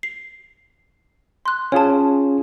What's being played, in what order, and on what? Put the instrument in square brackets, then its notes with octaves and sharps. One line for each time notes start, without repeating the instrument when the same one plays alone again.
[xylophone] C7
C6 F#6
[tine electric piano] C#4 F4 G#4 [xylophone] C#5 A5